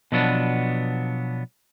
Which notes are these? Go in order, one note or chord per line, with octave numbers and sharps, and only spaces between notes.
B2 F3 F#3 B3 D4